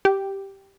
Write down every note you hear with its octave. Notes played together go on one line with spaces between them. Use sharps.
G4